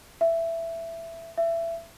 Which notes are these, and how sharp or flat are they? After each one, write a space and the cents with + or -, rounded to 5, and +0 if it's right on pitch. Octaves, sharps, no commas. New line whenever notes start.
E5 +10
E5 +20